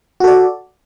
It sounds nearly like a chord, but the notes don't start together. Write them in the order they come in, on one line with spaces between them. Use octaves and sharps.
F#4 A4 D5